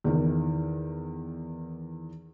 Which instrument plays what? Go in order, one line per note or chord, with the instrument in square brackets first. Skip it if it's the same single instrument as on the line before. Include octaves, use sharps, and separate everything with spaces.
[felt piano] E2 D#3 E3